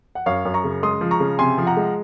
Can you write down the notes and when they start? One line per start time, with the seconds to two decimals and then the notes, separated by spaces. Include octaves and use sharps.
0.15 F#5
0.26 F#2 C#5 F5
0.45 F#2
0.54 A#5 C#6
0.64 C#3
0.83 G#3 C6 D#6
1.01 F3
1.11 A#5 C#6
1.20 C#3
1.38 C3 G#5 C6
1.58 F3
1.67 F#5 A#5
1.77 G#3